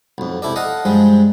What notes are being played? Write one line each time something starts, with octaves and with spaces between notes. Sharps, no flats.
B1 F2
C3 E4 A4 D5
A4 D#5 F5 F#5
G2 F3 G3 G#3